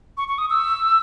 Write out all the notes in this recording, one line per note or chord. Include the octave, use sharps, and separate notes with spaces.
C#6
C#6
D#6
E6